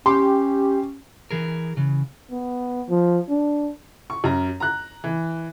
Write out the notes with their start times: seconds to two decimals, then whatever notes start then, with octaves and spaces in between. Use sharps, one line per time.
0.06 C#4 G4 C6
1.31 E3 G#4 A#4
1.77 C#3 E3
2.31 B3
2.89 F3
3.29 D4
4.10 C#6
4.24 F#2 A#5
4.60 A#5 F#6
5.04 E3